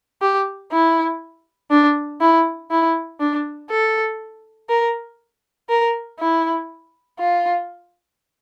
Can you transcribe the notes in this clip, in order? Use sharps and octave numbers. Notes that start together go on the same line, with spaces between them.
G4
E4
D4
E4
E4
D4
A4
A#4
A#4
E4
F4